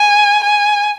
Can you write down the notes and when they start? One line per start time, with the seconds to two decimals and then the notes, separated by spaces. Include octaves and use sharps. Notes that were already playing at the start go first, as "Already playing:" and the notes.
Already playing: G#5
0.44 G#5